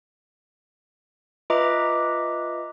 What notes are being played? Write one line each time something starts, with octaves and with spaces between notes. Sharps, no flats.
F4 B4 D#5 E5 A#5 D6